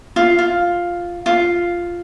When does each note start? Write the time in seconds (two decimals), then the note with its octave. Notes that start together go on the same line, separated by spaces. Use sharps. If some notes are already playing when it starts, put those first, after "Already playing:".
0.16 F4
0.39 F4
1.26 F4